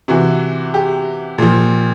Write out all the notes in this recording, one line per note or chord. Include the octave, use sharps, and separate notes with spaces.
C3 E3 F#4
G4
A#2 F3